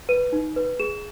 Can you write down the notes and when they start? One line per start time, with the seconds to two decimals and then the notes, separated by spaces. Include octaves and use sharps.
0.09 B4 D#7
0.32 D#4
0.56 B4
0.80 G#4 E7